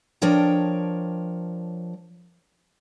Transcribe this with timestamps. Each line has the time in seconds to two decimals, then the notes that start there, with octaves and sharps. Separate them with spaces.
0.22 F3 D4 A#4 C#5 G5